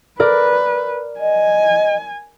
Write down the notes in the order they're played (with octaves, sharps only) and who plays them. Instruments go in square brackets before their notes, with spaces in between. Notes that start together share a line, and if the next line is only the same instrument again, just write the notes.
[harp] A#4 D5 [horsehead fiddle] B4
[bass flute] D#5 [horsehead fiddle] G#5